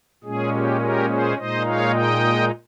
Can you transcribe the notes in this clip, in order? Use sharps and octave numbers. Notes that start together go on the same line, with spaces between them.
A#2 G#3 C#4 G#4
G4
G4 A#4
G#4 C5
A#2 G#3 D#4 C5 D#5
C#5 F5
D#5 G5